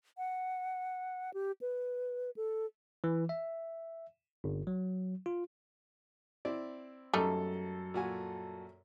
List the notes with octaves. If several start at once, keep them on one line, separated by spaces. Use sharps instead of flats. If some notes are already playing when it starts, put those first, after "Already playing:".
F#5
G4
B4
A4
E3
E5
G1
F#3
F4
C4 E4 D5
F#2 G3 A3 D#4 A4
A#2 F#4 G#5